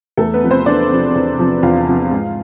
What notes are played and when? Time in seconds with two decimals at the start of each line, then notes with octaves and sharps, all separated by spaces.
0.17 E2 A3 A4
0.34 B3 B4
0.43 C3 F3
0.50 C4 C5
0.66 E2 D4 D5
0.90 C3 F3
1.15 E2
1.39 C3 F3
1.63 E2 F4 F5
1.87 C3 F3
2.12 G#2